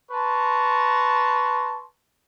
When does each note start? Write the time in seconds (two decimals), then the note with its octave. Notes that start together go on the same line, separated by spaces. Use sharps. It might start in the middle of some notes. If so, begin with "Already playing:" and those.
0.12 B4 A5 A#5 C6 C#6